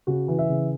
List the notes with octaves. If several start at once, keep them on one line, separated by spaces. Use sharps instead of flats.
C#3 F#4
E3
E5
C#3